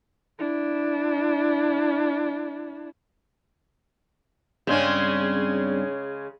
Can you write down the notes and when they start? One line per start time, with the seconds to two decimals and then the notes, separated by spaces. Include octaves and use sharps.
0.39 D4 E4
4.67 G2 C#3 G#3 C4 C#4